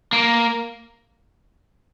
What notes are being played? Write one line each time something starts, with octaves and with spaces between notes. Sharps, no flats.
A#3